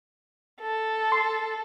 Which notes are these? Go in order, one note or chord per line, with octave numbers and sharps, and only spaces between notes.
A4
C6